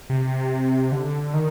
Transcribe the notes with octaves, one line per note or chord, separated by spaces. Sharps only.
C3
D3
D#3